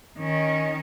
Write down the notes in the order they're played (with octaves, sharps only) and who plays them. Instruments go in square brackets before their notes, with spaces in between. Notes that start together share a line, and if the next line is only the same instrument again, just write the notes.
[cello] D#3 C#4